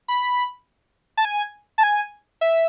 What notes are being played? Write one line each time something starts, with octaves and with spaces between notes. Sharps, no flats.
B5
A5
G#5
A5
G#5
E5